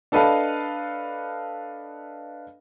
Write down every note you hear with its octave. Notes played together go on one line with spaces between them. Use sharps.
D4 A4 B4 D#5 F5 A5